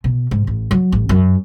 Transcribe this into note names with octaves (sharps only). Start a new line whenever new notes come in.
B2
G#2
A1
F#3
A1
F#2